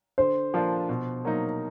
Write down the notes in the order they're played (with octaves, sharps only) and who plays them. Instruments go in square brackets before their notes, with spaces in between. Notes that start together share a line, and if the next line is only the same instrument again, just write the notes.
[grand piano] D3 [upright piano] C5
[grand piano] F3 A#3 D4 F4
B2
F#3 A#3 D#4